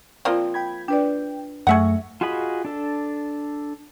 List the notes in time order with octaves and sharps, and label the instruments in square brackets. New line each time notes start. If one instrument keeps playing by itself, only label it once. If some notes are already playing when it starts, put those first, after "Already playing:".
[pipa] F3 A#3 C4 [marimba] F4 C5 D5
[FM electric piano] G5 B5 G#6
[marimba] D4 B4 D5 [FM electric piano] G5
[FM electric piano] F#2 A3 C#6 [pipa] G#4 E5 F#5
[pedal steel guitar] F4 F#4 G#4 D#5 B5
D4 A4